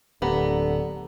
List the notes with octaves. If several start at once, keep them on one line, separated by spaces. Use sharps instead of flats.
D1 D3 B3 G4 A#5